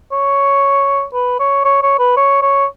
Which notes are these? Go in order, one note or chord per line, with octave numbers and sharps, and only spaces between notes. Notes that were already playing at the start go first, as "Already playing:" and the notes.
C#5
B4
C#5
C#5
C#5
B4
C#5
C#5